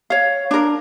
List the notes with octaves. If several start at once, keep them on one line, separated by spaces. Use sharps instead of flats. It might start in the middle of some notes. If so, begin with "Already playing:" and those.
C#5 F5
D4 A#4